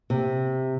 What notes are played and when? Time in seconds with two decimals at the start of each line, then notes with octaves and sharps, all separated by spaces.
0.10 C3